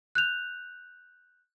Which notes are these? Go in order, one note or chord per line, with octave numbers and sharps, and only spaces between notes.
F#6 G6 F7